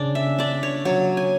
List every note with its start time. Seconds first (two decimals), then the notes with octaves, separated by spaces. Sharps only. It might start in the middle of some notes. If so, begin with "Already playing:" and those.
Already playing: C#3 D4 D5
0.15 E5
0.39 D4 D5
0.63 C#5
0.85 F#3 C#5
1.17 G#5